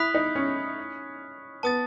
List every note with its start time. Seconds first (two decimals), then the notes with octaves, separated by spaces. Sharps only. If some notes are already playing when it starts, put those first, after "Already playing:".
Already playing: E4 B5 D#6 F#6 B6
0.14 D#4
0.35 C#4
1.63 B3 A5 D#6 A6